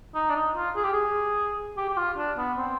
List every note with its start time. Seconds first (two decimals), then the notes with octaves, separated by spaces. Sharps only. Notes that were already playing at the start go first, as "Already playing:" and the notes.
0.15 D#4
0.30 D4
0.35 D#4
0.56 F4
0.76 G#4
0.84 G4
0.93 G#4
1.77 G4
1.89 G4
1.97 F4
2.18 D4
2.38 B3
2.58 C4